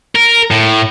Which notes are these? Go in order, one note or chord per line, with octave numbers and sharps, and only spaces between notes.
A#4
A2